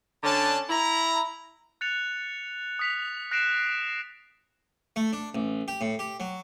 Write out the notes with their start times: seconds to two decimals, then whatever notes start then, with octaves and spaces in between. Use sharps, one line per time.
0.23 D3 C#4 D4 A5
0.69 E4 A#5
1.81 F#6 A6 C#7 F7
2.79 D#6 B6 F7
3.31 F#6 A#6 C7 D7 E7
4.96 A3
5.13 D4
5.35 A1
5.68 G4
5.81 A2
5.99 G4
6.20 F#3